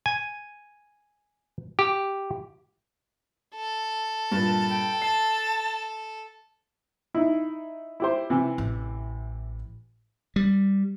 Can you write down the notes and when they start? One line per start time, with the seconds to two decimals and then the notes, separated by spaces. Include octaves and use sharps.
0.06 G#5
1.79 G4
3.56 A4
4.31 G2 A#2 A5
4.70 G5
5.02 A5 C7
7.14 D#4 E4
8.00 E4 G4 C5
8.30 C3 E3
8.58 A1
10.36 G3